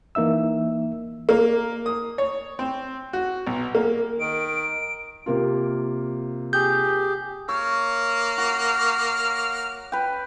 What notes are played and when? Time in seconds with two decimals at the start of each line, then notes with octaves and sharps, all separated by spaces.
0.15 E3 A#3 D#4 E5 E6
1.29 A#3
1.86 D#6
2.18 C#5
2.59 C4
3.13 F#4
3.47 B1
3.75 A#3
4.19 D#3 D7
5.26 C3 A#3 F4
6.53 G4 G#4 G6
7.49 A#3 C#5 F6
8.38 F#4
9.92 B4 G5